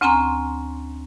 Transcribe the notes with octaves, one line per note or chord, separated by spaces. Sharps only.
D2 C4 C#4 G#5 A#5 C6